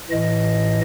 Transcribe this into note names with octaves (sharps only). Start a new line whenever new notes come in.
A2 E3 D#5